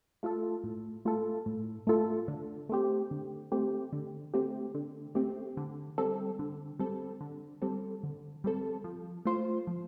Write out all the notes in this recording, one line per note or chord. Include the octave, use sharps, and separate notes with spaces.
A3 F4 A4
A2
A3 F4 A4
A2
A3 F4 A4
D3
A3 C4 G4
D3
A3 C4 G4
D3
A3 C4 G4
D3
A3 C4 G4
D3
G3 C4 A4
D3
G3 C4 A4
D3
G3 C4 A4
D3
G3 C4 A4
F3
A3 F4 C5
F3